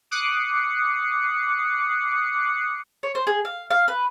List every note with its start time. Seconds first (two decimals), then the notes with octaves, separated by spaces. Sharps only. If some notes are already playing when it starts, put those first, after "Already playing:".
0.11 D6 D#6 F#6 C7 C#7
3.03 C#5
3.15 C5
3.27 G#4
3.45 F5
3.70 F5
3.88 B4